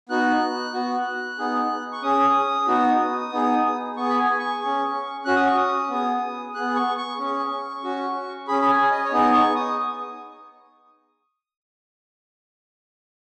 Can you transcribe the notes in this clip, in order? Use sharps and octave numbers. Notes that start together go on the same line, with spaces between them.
B3 D#4 F#4 F#6
B3 F#4
B3 D#4 G#4
C#6
C#4 G#4 D#6
B3 D#4 F#4
B3 D#4 G#4
B3 G#4 C#6
B5
G#5
C#6
C#4 G#4
C#4 F#4 F#6
D#6
C#6
D#6
B3 G#4
B3 G#4 F#6
C#6
C#6
C#4 G#4
C#4 F#4
C#4 G#4 B5
B5
G#5
D#5
C#5
B3 D#4 G#4 D#5
C#6
D#6